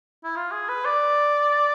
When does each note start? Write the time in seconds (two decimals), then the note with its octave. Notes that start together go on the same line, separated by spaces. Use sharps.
0.24 E4
0.36 F4
0.52 G#4
0.69 B4
0.85 D5